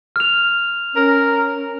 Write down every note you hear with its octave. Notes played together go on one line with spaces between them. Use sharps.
F6 F7
C#4 A#4